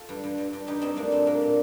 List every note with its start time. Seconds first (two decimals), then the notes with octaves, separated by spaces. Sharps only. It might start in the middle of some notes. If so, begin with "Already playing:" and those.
Already playing: F4 A4
0.09 G2
0.24 G2
0.38 G2
0.53 G2
0.67 G2 D#4 G4
0.81 G2 C4 D#4
0.96 A3 A#3 D4
1.12 A#2 C4
1.26 A#2 A#3
1.41 A#2